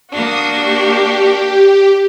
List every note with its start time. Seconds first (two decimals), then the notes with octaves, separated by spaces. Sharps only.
0.10 A#3 D4 F#4 D#6
0.53 G4